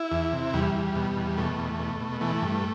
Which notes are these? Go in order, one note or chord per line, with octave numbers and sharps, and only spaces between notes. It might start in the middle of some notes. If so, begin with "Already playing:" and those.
Already playing: E4
E2
C3
E2 G3
E2
B2
E2
B2 A3
E2
B2
B2
E3 A3
G2